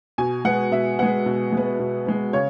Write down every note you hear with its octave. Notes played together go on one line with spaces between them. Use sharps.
B2 G#5
G#3 B3 F#5
B2 E5
G#3 B3 F#5
B2
G#3 B3
B2
G#3 B3
C#3 C#5